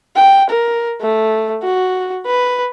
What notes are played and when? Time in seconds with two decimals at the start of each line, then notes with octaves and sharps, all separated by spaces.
0.16 G5
0.50 A#4
1.01 A3
1.63 F#4
2.27 B4